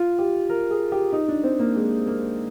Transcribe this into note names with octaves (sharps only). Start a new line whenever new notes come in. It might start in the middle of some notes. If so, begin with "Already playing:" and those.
Already playing: F4
G4
A#4
G#4
G4
D#4
D4
C4
A#3
G#3
A#3